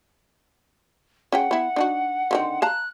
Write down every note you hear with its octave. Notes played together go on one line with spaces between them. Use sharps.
C#4 G#4 F#5 G5
B3 E4
D4 D#4 F#4
D3 D#3 C4
F5 A5 A#5 F#6